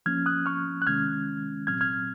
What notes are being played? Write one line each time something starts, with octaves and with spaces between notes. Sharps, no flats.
F3 A#3 C#4 F6 G#6
D#6 F#6
C#6 F6
F#6
C3 D#3 G#3 C#4 F6 G#6
A#2 F#3 C4 F6 G#6
F6 G#6